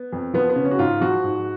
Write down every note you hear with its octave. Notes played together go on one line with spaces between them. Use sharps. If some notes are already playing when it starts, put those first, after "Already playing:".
Already playing: B3
F2
F3 B3
B3
C#3
C#4
F#4
G#2 F4
F3 F#4
G#2